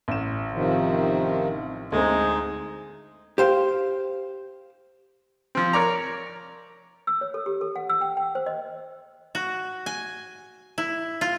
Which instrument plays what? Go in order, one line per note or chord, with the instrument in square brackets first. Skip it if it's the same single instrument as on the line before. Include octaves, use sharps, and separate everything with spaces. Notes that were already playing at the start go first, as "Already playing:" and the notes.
[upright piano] A1 E7
[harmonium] C3 D#3 F3
[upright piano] D2 C4 [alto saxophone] G#3 [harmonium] D#4
[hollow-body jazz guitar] G4 C5 F5
[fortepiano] F3 C4
A#4 C#5 D5 A#5
[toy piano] E6
C#5
A4
G4
A4
F#5
E6
G5
G5
C5
D#5
[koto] F#4
G#5
E4
F4